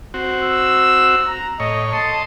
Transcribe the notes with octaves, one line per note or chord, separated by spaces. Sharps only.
C4 F#4
E6
A#5
A2 C#5 D#5
D#5 A5 C6